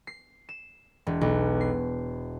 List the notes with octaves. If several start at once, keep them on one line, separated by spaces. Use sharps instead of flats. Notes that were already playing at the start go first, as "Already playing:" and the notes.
C7
E7
E1
B1
C7